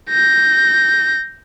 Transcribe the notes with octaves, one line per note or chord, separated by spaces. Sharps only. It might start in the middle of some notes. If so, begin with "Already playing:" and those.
G6 A#6